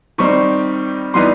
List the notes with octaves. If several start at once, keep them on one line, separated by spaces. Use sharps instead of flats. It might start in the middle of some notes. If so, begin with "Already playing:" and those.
D#3 G3 C4 D#4 C#6
E3 G3 B3 D#4 C6